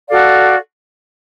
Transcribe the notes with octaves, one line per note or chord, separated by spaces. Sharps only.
F#4 A4 D5 F5